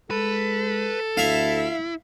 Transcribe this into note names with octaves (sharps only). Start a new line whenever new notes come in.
G#3 A4 B4
D2 E4 E5 F5